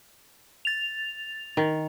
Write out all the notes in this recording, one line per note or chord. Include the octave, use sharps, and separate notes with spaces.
A6 F7
D#3